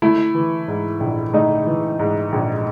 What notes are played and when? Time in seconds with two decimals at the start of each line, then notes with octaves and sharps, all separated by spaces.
0.02 A3 E4
0.35 E3
0.68 G#2
1.00 A#1
1.33 A3 D#4
1.67 E3
1.99 G#2
2.32 A#1